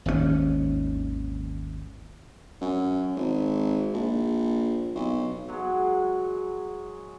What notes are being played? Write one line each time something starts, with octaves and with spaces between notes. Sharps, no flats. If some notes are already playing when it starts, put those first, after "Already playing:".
G#1 D#2 B2 C#4
F#2
G#1
A#1
B1
F#3 G#3